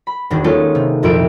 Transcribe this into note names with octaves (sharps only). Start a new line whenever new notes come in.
B5
E1 D#3 D4
G#3 A#3 C#4 D#4 F4 A4
C3
C2 F2 A#2 E4 D7